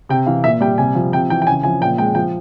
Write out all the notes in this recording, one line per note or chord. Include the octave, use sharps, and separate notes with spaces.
C3 G5
E3 F5
A#2 E5
G3 G5
C3 G#5
F3
C3 G5
E3 G5
G5
C#3 G#5
F3 G#5
A#2 G5
G#3 G5
F3 G5